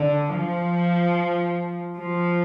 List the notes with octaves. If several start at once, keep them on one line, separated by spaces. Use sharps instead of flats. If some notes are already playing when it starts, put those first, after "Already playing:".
Already playing: D3
F3
F3